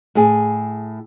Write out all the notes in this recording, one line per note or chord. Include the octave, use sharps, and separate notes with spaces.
A2 G#4